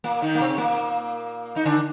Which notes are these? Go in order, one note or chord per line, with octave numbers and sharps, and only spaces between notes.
A#2 A#3
D#3 D#4
A#3
C3 C4
A#2 A#3
D#4
D3 D4